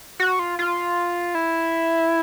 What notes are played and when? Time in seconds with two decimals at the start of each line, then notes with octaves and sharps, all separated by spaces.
0.20 F#4
0.39 F4
0.59 F4
1.35 E4